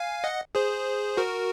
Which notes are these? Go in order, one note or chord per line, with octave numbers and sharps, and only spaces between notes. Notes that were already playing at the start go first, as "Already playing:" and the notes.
Already playing: F5 G#5
D#5 F#5
G#4 C5
F#4 A#4